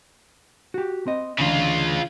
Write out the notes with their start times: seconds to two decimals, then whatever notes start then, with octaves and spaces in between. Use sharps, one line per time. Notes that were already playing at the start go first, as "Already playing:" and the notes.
0.74 F#4 G4
1.07 C4 D#5
1.39 D2 C#3 E3 D4 F4